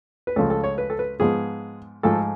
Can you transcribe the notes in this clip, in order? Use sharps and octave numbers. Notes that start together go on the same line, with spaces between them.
B4
C#2 C#3 F3 A3 A4
A4
C#5
B4
A4
B4
G#2 F3 G#3 B3 G#4
G#2 F3 A3 A4